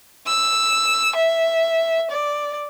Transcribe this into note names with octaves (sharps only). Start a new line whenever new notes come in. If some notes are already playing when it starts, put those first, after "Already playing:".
E6
E5
D5